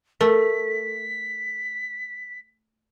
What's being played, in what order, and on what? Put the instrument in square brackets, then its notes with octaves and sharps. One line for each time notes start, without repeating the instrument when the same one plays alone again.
[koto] A3 [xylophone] A4 A#4 [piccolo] B6